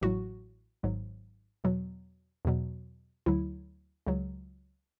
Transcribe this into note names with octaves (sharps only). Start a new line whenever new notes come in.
A1 A2 F#3 F#4
G#1 G#2 F#3
E2 B2 F#3
E2 B2 F#3
D2 D3 F#3 E4
C#2 C#3 F#3